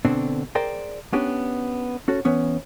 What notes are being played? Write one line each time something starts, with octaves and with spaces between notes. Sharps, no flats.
B2 D3 C4 D4
G#4 A#4 C5 D5 G5
B3 C#4 D4 G4
C#4 F#4 A4
E3 B3 C#4